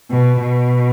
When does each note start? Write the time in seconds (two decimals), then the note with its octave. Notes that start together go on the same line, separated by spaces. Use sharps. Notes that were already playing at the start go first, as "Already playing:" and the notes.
0.11 B2
0.44 B2